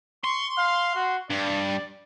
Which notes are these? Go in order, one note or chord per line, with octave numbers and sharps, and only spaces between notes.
C6 C#6
F5
F#4
G2 D5